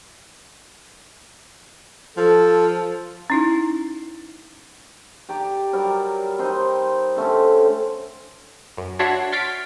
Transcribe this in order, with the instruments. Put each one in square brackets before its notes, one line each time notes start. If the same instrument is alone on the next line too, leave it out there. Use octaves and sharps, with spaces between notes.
[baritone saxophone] F3 [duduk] A4
[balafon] C#4 D#4 E4
[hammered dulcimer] G4 D5 A#5
F#3 G3 A#4
C4 D#4 C6
D3 A3 C4 C#4
[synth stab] F#2
D4 F#4 C#5 E5 F#5 C6
C6 C#6 F6 A6 B6 D7